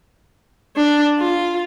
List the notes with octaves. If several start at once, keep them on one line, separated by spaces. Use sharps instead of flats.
D4
F4